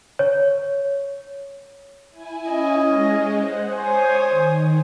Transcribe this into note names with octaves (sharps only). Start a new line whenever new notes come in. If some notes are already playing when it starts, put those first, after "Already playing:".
C#5
E4 G#5
C#4 D#5
G#3
C5 F#5
C5 C#5 G#5 D#6
D#3